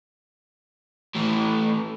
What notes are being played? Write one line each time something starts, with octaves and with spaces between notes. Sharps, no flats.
A2 E3